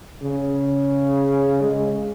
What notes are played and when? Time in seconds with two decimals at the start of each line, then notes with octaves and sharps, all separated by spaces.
0.22 C#3
1.61 G#3